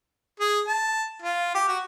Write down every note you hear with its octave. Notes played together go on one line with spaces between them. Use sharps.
G#4
A5
F4
G4
F#4